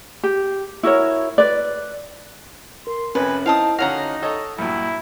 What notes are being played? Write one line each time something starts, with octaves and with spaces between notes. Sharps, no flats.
G4
E4 F#4 A#4 C#5
B4 D5
A#4 C6
F2 C3 C#4 B4 C#5 G#5
C4 D#4 E4 D#5 F5 A5 D#6
D3 C#4 D#4 F#4 F5 F#5 A#5 A#6
A4 C#5 D#5
G2 A#2 F#3 E4